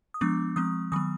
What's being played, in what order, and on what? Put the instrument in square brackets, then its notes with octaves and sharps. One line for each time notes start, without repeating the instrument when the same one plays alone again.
[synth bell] D#6
F3 G#3 B3 D4 D6
F3 G#3 C4 D#6
D#3 F#3 B3 D#6